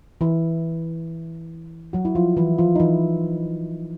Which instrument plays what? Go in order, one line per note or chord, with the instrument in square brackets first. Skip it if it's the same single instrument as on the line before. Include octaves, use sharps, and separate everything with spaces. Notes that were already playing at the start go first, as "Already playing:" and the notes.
[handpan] E3 E4
F#3 F#4
E4
F3 F4
E3 E4
F3 F4
D#4
E3 E4